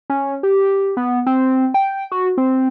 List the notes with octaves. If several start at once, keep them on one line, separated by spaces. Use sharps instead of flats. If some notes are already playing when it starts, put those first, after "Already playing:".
C#4
G4
B3
C4
G5
F#4
C4